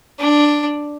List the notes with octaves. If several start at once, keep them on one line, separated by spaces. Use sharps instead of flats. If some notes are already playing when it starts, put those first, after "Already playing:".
D4